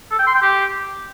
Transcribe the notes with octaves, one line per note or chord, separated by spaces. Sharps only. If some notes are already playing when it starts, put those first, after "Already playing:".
A4
G5
C6
G5
G4